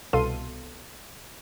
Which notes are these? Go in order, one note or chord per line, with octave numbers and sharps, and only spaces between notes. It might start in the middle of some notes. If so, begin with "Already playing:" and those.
C2 B2 A4 F5 C6 D#7